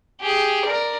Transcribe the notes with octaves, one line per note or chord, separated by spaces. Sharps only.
G4 G#4
A#4 D5